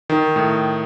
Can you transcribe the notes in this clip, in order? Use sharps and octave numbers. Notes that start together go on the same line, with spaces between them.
D#3
A2